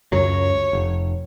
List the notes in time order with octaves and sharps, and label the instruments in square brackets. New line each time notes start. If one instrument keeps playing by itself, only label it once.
[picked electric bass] C#2 F#2 F#3 [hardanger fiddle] C#5
[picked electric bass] F1